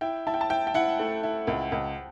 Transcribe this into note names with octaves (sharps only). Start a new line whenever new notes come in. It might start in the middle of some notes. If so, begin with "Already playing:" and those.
E4 G5
E4 A5
G5
A5
E4 G5
G5
E4 F#5
A3
E4
C#2
C#2